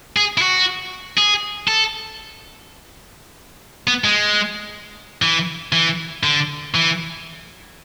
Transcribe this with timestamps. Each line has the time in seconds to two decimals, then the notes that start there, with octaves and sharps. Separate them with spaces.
0.17 G#4
0.38 E4
0.42 F#4
1.18 G#4
1.68 A4
3.87 B3
4.04 G#3
5.22 E3
5.73 E3
6.23 D3
6.74 E3